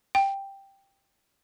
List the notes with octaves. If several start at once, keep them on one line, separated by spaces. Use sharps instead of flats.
G5